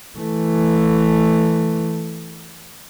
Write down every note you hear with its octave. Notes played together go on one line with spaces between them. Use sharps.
E3 A3